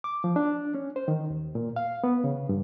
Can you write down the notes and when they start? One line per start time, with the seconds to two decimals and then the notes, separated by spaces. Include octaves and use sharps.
0.04 D6
0.24 F3
0.36 D4
0.75 C#4
0.96 C5
1.08 D#3
1.30 D#2
1.55 A#2
1.76 F5
2.04 B3
2.24 C#3
2.49 G2